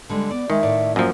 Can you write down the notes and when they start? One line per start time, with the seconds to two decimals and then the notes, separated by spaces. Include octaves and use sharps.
0.09 D3 G3 G#3
0.31 B3 D5
0.50 D#3 G3 G#3 E5
0.63 A2 D5
0.96 F#2 F3 A#3